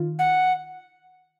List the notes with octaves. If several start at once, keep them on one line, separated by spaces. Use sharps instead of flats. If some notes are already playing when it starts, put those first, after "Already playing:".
Already playing: D#3 F4
F#5